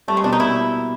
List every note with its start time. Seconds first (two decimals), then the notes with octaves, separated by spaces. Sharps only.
0.08 G3 A3
0.17 G#3
0.24 B2 D4
0.32 D#4
0.40 A#3 E4